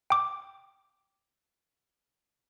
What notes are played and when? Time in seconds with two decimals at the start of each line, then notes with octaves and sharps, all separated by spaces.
0.10 G5 D6